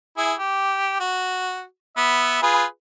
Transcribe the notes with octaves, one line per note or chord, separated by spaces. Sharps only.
E4 G#4
G4
F#4
B3 E5
F4 G#4 B4